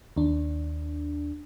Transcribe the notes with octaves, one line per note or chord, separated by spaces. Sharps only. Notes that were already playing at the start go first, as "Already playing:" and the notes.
D#2 D4